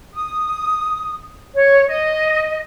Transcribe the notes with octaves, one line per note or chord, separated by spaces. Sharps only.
D#6
C#5
D#5